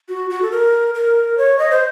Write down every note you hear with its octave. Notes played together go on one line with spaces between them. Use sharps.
F#4
F#4
A4
A#4
A#4
C#5
D#5
C5